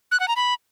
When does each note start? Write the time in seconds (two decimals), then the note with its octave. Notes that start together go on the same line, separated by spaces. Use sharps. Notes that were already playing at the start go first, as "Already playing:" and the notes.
0.11 F#6
0.20 F#5
0.28 A#5
0.36 B5